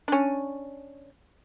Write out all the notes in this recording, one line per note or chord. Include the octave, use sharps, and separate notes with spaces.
C#4 D4